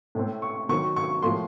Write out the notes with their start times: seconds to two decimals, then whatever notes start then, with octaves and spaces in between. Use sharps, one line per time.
0.15 A2 A3 C4
0.42 C#6
0.69 D#3 F#3 C4 C#6
0.96 C#6
1.22 A2 F3 A#3 C6